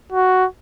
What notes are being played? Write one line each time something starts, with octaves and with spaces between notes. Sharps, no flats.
F#4